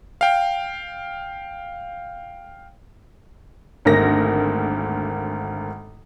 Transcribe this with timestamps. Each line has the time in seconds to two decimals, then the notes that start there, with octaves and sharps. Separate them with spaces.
0.21 F5 G5
3.85 G#1 D2 A#3 A#6